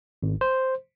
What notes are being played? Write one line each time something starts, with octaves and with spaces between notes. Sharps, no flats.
G#1
C5